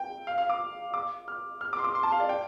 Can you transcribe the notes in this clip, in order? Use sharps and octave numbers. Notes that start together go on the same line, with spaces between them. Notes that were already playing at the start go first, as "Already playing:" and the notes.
Already playing: G5
F5
F5
D6
D6
F6
F6
D6
C6
D6
C6
A5
F5
D5
G5